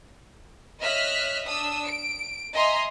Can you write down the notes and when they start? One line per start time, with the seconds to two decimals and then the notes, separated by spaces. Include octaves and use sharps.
0.81 C#5 D#5 E5 F6 F#6 B6
1.45 D4 D#6 E6
1.85 D7
2.54 D#5 E5 G#5 A#5 C6